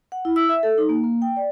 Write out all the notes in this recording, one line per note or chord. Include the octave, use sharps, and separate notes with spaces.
F#5
E4
E6
E5
A4
D#4
A#3
A#3
G5
D5